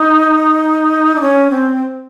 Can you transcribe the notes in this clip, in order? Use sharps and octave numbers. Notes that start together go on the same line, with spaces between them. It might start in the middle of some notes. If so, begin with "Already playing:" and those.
Already playing: D#4
D4
C#4
C4